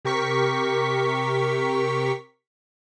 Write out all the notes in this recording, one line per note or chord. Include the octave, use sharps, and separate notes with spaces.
C3 G4 A#4 C#6 B6